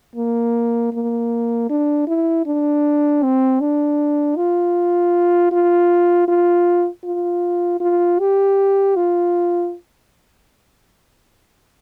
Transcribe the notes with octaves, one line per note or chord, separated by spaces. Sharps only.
A#3
A#3
D4
E4
D4
C4
D4
F4
F4
F4
F4
F4
G4
F4